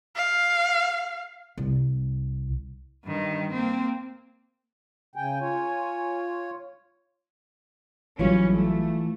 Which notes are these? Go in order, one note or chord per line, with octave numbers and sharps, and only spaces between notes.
F5
C2
G2 D#3
A#3 C4
C#3 G5 G#5
F4 C#5
A1 E3 F#3 G3 C#4 F4
A3